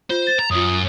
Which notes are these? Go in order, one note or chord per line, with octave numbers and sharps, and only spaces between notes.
F4 C5
A6 E7
A#5
F#2 F4 D#6